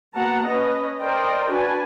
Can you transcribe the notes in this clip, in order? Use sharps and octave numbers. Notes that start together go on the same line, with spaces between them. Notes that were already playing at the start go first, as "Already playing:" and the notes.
A#3 B3 F#4 F#5 A5 A#5
C#4 B4 D#5
A#4 C5 D5 D#5 G5
D4 F#4 B4 G#5 A5